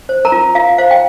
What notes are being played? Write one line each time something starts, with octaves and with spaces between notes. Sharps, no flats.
C5
A#4 A#5
F4
F4 F5
C5 F5
G5